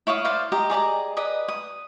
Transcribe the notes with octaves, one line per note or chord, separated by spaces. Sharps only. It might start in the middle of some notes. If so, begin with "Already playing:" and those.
E4 C#5 F5 D#6
C5 D5 F5
G4 D#5 A#5
G#4 D5 D#5 A#5
B4 D5 D#5 D#6
D#6